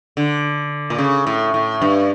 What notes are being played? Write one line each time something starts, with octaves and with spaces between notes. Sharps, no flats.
D3
A#2
C#3
A2
A2
G2